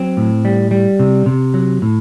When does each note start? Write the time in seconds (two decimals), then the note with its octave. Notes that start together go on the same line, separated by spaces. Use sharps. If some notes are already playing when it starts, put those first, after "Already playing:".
Already playing: F#3 C4
0.17 A2
0.45 G3
0.71 G3
0.99 C3
1.26 C3
1.54 F#3
1.82 A2